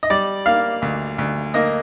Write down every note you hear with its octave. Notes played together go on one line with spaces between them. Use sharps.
D#5
G3 D5
A#3 F5
D2
D2
A#3 D#5